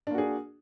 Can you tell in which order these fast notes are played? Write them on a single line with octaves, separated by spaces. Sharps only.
D4 A#3 F#4 G#4